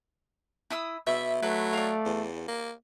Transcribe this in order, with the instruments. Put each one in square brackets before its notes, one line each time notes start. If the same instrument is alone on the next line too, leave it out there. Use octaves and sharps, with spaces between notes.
[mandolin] E4 D#6 E6
[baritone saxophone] B2 [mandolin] E5
[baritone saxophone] F#3 [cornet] A3 [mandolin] B4
[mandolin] D5 F5
[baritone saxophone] E2
A#3